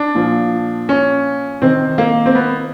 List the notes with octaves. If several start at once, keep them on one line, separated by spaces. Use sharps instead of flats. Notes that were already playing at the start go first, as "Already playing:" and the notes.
Already playing: D4
A#2 F3
C#4
C3 D#3 C4
A#3
C4
B3